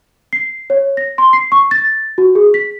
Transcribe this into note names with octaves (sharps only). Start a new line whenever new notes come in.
C7
C#5
A#6
C6
C7
C#6
A6
F#4
G#4
B6